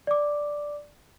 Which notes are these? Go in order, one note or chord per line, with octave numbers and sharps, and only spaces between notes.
D5 D6